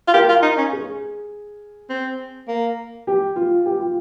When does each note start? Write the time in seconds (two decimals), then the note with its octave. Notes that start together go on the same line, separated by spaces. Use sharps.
0.08 F4
0.14 G4 A#4
0.29 F4
0.43 D#4
0.58 C#4
0.73 G#4
1.90 C4
2.48 A#3
3.07 G4
3.36 F4
3.66 G4
3.80 F4